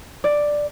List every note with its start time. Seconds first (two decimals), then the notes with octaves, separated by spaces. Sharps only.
0.24 D5